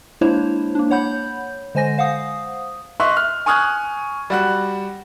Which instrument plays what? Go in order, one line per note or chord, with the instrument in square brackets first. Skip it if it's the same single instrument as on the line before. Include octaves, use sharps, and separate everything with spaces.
[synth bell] G#3 A#3 D4 E4 C5 C#5
A#3 D4
C#5 F#5 B5 G6
D3 G#3 C5 G#5 A#6
C5 F5 F#5 D#6
[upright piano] D#5 E5 C6 C#6 F#6
F6
G#5 C#6 D#6 F6 F#6 G#6
G3 F#4 F#6